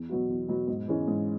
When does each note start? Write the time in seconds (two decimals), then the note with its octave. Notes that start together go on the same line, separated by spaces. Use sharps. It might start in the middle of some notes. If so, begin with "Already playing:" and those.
Already playing: E2
0.09 B2 F#3 B3 F#4
0.29 E2
0.49 B2 F#3 B3 F#4
0.68 G#2
0.88 E3 G#3 C#4
1.08 G#2